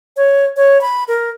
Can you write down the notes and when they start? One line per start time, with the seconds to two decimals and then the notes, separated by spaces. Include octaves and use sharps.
0.17 C#5
0.56 C#5
0.81 B5
1.08 A#4